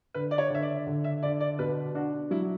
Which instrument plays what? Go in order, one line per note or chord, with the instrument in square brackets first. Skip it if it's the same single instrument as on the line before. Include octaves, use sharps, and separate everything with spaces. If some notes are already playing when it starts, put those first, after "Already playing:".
[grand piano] D3 [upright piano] B4
[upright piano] D5
C#5
[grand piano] D3 [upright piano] E5
[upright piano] D5
[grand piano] D3
[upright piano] E5
[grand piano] D3 [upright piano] D5
[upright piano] D5
[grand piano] B2 [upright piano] B4
[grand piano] D4 [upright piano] F#4
[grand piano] F#3 [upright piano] E4